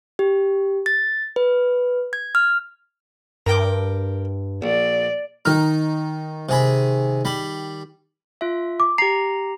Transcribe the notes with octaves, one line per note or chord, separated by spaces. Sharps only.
G4
A6
B4
G#6
F6
G2 A#4 G5 D6
A#1 D5
D#3 D#4 F6
C3 G#4 B5
G3 B5
F4 E5
D6
G4 A#5 C7